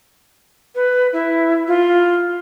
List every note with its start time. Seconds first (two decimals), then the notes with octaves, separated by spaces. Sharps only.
0.75 B4
1.13 E4
1.68 F4